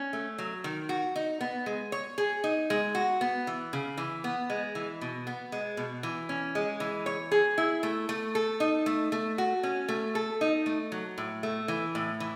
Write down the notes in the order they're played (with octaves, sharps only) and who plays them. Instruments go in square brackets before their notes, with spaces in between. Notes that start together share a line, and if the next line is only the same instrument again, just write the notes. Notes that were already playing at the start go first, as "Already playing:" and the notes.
Already playing: [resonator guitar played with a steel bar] C#4
A3
F#3
D#3
F#4
D#4
B3
G#3
C#5
G#4
D#4
G#3
F#4
B3
E3
C#3
E3
B3
G#3
E3
B2
B3
G#3
B2
E3
C#4
G#3
E3
C#5
G#4
E4
A3
A3
A4
D#4
A3
A3
F#4
C#4
A3
A4
D#4
A3
F#3
A2
A3
E3
A2
E3